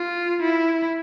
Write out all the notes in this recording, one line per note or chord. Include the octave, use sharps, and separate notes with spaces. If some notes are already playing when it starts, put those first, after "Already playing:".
Already playing: F4
E4